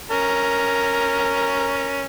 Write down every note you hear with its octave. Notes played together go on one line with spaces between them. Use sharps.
C#4 A#4